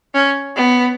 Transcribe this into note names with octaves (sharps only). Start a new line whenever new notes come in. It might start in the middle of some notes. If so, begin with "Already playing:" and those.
C#4
B3